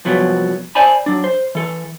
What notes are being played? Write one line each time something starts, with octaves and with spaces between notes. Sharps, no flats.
C2 F3 F#3 B3
C5 D5 G#5 A5 B5
F#3 D4
C5
E3 A4